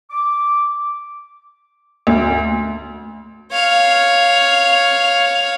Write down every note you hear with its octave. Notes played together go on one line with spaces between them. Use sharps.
D6
D2
C#5 F5